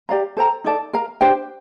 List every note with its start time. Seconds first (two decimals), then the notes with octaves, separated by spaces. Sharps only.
0.09 G4 D5 F5 A#5
0.37 A4 C5 G5 A#5
0.64 D#4 A4 D5 A5
0.93 A#4 F5 A#5
1.21 D4 G4 C5 G5